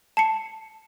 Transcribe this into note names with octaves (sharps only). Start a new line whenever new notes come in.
A5 C7 C#7